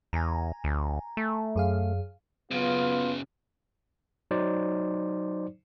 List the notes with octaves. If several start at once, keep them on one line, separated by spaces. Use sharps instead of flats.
E2 G#5 A#5
D2
A3
F#2 G#4 F5
F#2 C#3 B3 F4
F#3 D#4 C5 D5